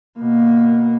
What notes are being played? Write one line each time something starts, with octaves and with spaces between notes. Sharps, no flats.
B2 A#3